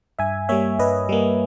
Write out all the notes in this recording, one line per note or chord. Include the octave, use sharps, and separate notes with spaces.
G2 E5 G#5
G3 A#3 C#5 E5
G2 B4 D#5
G3 A#3